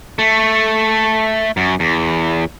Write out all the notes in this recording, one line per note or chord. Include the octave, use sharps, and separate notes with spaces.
A3
F#2
E2